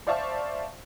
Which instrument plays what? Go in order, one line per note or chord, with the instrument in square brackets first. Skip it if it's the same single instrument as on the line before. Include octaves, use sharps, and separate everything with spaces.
[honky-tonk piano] C5 D5 E5 F5 A5 C#6